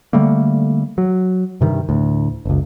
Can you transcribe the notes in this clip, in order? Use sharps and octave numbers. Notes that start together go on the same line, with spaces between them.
D3 G3 A3 A#3
F#3
G2 C3 D#3 G3
D2 A2
F#1 C#2